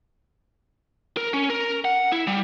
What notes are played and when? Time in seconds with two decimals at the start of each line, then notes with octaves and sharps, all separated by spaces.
1.17 A#4
1.34 C#4
1.50 A#4
1.85 F#5
2.12 E4
2.27 G3